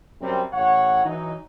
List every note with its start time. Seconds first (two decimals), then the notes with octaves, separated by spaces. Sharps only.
0.21 F#2 C3 G3 C4
0.52 A1 A2 C#5 F#5
1.05 E3 F#3 D#4